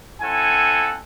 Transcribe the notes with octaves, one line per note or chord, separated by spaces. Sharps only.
C4 E4 A4 F#5 G#5